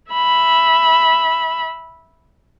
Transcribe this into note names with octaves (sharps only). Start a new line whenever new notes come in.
E5 B5